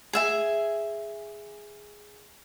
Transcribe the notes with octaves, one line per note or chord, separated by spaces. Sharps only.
G#4 E5 G#5